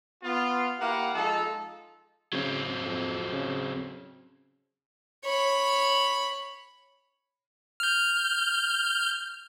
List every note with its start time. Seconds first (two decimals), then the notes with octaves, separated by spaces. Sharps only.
0.23 B3 F4
0.79 A#3 E4 G4 F5 F#5
1.14 F3 G#3 D#4 A4
2.33 C#3 F#3 C4
2.84 F2
3.32 C#3
5.25 C#5 B5
7.80 F6 G6